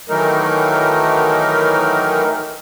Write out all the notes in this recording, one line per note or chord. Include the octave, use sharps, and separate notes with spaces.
D#3 E3 F#3 A3 D#4 A#4